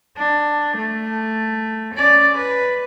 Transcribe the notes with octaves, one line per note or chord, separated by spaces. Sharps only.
D4
A3
C#4 D5
B4